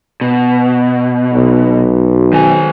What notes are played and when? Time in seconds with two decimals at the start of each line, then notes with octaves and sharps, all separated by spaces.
0.21 B2
1.34 B1
2.33 D#3 G#5